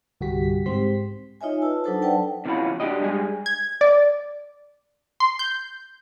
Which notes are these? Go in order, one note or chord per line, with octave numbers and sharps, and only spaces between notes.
C2 G2 D3 F#4 G4 B6
G#2 C4 G4 C6 B6
D#4 F4 C#5 D#5 E5 G#5
F4 B4 A5 E6
F#3 D4 D#4 A4 C5 A5
B4 D5 F#5 G5 A5
C3 E3 C#4 F4 F#4 B5
D4 D#4 F#4 G4 D#5
G2 G3 G#3 G#5
G#6
D5
C6
G6